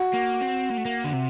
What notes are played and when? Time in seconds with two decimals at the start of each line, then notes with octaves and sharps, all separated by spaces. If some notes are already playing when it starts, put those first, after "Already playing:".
Already playing: F#4
0.14 A#3
0.42 C4
0.71 A#3
0.78 A3
0.85 A#3
1.04 D3
1.13 C3